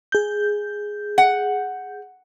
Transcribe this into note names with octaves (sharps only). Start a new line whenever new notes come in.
G#4 G6
F#5